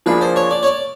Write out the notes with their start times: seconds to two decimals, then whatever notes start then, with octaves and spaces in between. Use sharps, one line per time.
0.06 F3 A#3 D4 F4 G#4 B4
0.21 C5
0.36 C#5
0.51 D5
0.63 C#5
0.66 D5